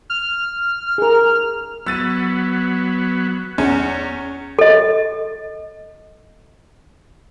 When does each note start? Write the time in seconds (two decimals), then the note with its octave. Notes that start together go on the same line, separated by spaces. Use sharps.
0.10 F6
0.98 G#4 A#4
1.87 F#3 B3 E6 A6 D#7
3.58 E2 C#4
4.59 A4 D#5